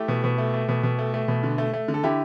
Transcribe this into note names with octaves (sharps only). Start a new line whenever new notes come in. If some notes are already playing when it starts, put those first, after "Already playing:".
Already playing: A3 E4 G4
B2
B2
A3
A3
B2
B2
A3
A3
B2
D3
A3
A3
D3
A4
D3 E4 G4